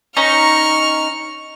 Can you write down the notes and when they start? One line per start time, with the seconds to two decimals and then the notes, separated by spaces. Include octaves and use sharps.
0.17 C#4 D#4 A#5 C#6 F6